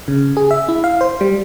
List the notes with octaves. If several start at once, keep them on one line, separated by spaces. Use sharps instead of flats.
C#3
G#4
E5
E4
F5
C5
G3